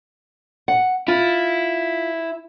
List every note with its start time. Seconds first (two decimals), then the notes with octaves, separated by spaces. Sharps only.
0.68 F#5
1.08 E4 F4